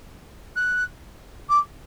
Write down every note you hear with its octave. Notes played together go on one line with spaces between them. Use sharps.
F#6
D6